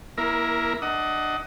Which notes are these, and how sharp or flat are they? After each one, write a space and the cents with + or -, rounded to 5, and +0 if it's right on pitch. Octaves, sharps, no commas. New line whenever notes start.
A#3 +25 E4 +0 A#4 +0
D4 +30 D#5 +20 F#5 +20